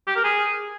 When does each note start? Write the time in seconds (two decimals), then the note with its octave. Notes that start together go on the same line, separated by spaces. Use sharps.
0.07 G4
0.16 A#4
0.24 G#4